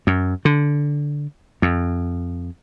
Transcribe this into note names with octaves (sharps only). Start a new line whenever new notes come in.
F#2
D3
F2